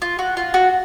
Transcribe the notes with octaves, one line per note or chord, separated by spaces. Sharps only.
F4
F#4
F4
F#4